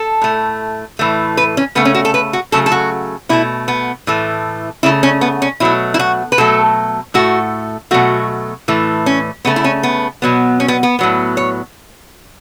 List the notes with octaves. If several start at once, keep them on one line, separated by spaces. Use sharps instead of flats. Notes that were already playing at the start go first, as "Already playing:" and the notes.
Already playing: A4
A2 A3
A2 E3 A3
B4
C#4
C#3 A3 B3
C#4
F#4
A4
B4
F#4
C#3 F#3 A3 A4
A4
F#4
B2 A3 E4
B3
A2 E3 A3
C#3 A3 E4
C#4
B3
C#4
B2 F#3 A3 E4
E4
F#4
B4
B2 F#3 A3 A4
A2 A3 F#4
B2 F#3 A3 F#4
A2 E3 A3
C#4
C#3 A3 B3
E4
C#4
B3
B2 F#3 B3
C#4
B3
B3
A2 F#3 B3
C#5